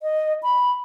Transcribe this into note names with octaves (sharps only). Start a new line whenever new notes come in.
D#5
B5